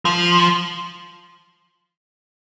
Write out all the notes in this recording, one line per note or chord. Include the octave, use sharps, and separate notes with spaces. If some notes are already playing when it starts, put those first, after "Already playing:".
F3